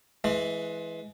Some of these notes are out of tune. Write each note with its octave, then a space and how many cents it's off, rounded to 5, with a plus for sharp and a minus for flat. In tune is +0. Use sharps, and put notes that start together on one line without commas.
E3 +0 G#3 +25